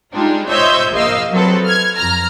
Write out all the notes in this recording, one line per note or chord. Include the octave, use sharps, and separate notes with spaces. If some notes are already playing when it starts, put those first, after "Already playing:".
G3 G#3 D4 D#4 F4
C5 C#5 D#5 E5 E6 G6
A#1 A#3 D#5 F5 E6
F#3 C4 A4 B4
F6 G#6
F2 A#5 F6